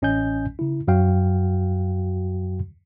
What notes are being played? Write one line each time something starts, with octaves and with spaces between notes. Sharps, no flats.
A1 C#4 D#5 G#5 G6
C#3 E4
F#2 F#3 F#4 F5 G5